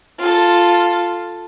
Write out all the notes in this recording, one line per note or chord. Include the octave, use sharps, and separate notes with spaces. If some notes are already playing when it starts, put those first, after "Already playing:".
F4 A4